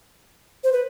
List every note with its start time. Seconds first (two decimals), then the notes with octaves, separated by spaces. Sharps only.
0.64 C5
0.72 B4